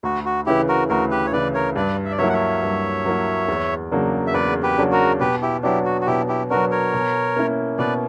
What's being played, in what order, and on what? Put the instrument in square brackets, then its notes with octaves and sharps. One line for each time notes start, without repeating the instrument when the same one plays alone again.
[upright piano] D2 [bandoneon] F#4
[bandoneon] F#4
[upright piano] C#3 E3 [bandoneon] E4 G4
[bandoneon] F#4 A#4
[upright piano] D2 [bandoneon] F#4 A#4
[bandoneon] G4 B4
C#5
[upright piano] C#3 E3 [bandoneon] B4 D5
[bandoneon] A#4 C#5
[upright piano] G2 [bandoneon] B4 D5
[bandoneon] E5
D5
[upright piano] F#3 A#3 E4 [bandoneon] C#5 E5
[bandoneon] F#5
C#5 E5
[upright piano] G2
F#3 A#3 E4
E2
C#3 F#3 A#3 D4
[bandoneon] E5
[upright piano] E2 [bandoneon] B4 D5
[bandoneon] G4 B4
[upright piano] C#3 F#3 A#3 D4
[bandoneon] F#4 A#4
[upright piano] B2 [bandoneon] G4 B4
[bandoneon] E4 G4
[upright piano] F#3 B3 D4 [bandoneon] E4 G4
[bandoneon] F#4
F#4
[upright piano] B2 [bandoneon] E4 G4
[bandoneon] E4 G4
[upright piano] F#3 B3 D4 [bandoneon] F#4 A#4
[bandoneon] A#4 C#5
[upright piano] B2
A#3 C#4 E4
[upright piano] B2 [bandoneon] B4 D5